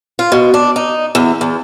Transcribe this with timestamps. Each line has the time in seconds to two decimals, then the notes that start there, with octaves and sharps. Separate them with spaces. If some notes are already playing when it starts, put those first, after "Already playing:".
0.19 F4
0.32 B2
0.54 D4
0.76 D#4
1.15 E2
1.41 E2